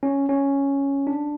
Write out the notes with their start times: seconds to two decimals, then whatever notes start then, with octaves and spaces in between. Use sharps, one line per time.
0.03 C#4
0.29 C#4
1.07 D4